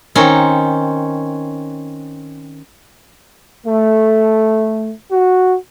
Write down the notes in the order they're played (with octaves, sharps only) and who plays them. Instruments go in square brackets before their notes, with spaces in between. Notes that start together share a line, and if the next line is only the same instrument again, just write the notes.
[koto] D#3 C4 C#4
[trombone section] A3
F#4